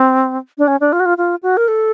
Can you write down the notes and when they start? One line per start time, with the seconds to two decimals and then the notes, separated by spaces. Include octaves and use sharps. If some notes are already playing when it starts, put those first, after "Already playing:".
Already playing: C4
0.58 D4
0.68 C#4
0.81 D4
0.93 F4
1.00 F#4
1.06 F4
1.18 F4
1.43 F#4
1.57 A#4
1.68 A4